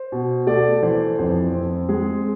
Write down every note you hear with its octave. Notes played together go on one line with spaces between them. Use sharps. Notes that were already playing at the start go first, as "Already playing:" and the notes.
Already playing: C5
B2
A3 D5
E3 C5
F2 C5
C4
G#3 G#4